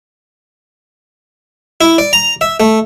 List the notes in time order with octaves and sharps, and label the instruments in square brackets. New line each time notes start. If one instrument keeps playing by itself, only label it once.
[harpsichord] E4
D5
A#5
E5
A3